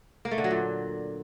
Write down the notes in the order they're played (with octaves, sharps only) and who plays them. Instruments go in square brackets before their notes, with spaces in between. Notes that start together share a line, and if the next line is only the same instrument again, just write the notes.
[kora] A#3
A3
D3
F#3
A#2